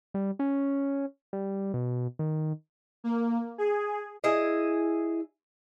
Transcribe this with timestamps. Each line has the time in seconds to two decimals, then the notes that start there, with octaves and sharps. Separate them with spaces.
0.14 G3
0.39 C#4
1.33 G3
1.74 B2
2.19 D#3
3.04 A#3
3.58 G#4
4.24 E4 G#4 D#5